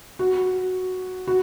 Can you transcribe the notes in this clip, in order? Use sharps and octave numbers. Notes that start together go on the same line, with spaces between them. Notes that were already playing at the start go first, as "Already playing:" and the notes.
F#4
F#4